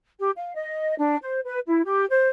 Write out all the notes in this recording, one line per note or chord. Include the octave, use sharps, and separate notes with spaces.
G4
F5
D#5
D4
C5
B4
E4
G4
C5